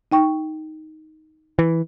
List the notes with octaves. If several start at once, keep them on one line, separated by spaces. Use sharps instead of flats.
D#4 G5 C#6
E3